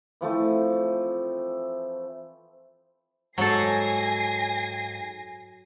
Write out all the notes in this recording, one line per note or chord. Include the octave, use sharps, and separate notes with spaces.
E3 F3 A3 C4
G#2 F#3 A4 G#5 A#6 C7